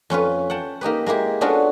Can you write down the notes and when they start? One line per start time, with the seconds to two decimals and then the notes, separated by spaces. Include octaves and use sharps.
0.10 F2 C#4 F4 B4
0.50 F#5 G5 A5
0.81 A#3 D#4 G4 B4
1.06 G#3 A#3 E4 G4
1.41 B3 C#4 D4 F4 F#4 A4